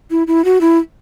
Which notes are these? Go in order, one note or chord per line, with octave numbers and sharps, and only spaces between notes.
E4
E4
F#4
E4